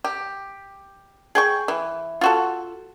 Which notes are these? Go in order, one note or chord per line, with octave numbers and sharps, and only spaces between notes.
G4
G#4 G5 C#6
E3
F4 F#4 A4